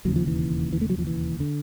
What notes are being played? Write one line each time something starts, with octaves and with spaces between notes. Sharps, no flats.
E1 D#2 C#3 F#3
F3
E3
E3
A3
F#3
F3
E3
D3